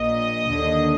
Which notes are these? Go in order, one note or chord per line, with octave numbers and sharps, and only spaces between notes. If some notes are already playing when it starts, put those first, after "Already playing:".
Already playing: A#1 A#2 D#5
D#2 D3